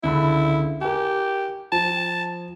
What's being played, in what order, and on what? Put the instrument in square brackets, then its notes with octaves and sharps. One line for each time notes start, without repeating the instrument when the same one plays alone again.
[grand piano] C#2 D3 B5 [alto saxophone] E4
[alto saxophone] G4 [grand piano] A#4 G#5
[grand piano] F3 [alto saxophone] A5